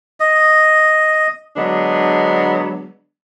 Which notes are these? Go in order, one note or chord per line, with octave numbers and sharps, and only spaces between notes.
D#5
D3 F#3 G#3 B3 D4